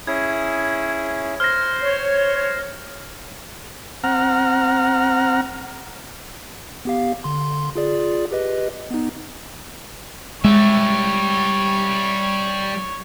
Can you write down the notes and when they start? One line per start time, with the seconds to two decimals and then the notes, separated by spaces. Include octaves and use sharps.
0.07 C#4 E4 G#4 G#6
1.40 C5 C6 F6 A#6
1.82 C#5
4.04 C4 F#5 A#5 F6
6.85 B3 G4 F5
7.24 D3 C6
7.76 F4 G#4 D5
8.31 G4 B4 D#5
8.91 B3 D#4
10.44 G3 G#3 C#5 E5